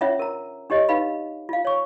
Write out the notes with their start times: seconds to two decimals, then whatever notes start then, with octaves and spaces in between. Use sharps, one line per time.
0.01 C#4 D4 F4 C#5 E5 F#5
0.19 A#4 A#5
0.70 D4 G4 C#5 D#5
0.89 D#4 B4 F5 B5
1.49 F4 F5
1.65 C#5 C#6